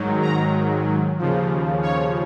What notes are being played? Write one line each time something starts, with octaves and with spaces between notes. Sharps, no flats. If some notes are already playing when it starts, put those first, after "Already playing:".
Already playing: G#2 D#3 F#3
A#5
D#2 C#3 F3
C#5